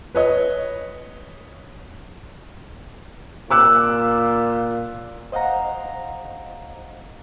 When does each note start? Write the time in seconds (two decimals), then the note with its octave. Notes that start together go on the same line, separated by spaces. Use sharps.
0.15 B4 C#5 D#5
3.51 A#2 D6 E6 F#6
5.32 C5 D#5 F5 F#5 A#5